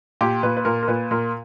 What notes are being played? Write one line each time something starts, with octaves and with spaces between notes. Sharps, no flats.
A#2 G4
A#2 B4
B4
A#2 A#4
A#4
A#2 B4
A#2 A#4